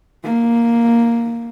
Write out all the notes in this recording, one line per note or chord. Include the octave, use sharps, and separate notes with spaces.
A#3